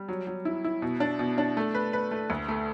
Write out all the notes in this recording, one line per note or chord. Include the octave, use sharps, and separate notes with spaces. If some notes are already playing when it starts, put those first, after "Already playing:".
Already playing: G3
F#3
F#3
E4
E4
B2
D4
B2
D4
A3
B4
B4
A3
D2
A3